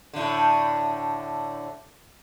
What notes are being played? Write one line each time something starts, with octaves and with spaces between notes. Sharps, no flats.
A2 D3